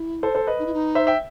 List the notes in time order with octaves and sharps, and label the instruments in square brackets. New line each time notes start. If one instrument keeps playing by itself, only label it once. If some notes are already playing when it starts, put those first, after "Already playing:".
Already playing: [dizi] E4
[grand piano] A4 C5
A4 C5
B4 D#5
[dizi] D#4
E4
D#4
[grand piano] C5 E5
E5 G5